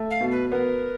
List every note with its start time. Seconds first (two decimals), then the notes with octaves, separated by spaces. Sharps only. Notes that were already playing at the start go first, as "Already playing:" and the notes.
Already playing: A3
0.10 F5
0.21 B2
0.31 B4
0.51 B3 A#4